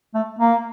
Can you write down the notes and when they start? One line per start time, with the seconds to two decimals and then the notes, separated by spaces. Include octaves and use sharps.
0.14 A3
0.39 A#3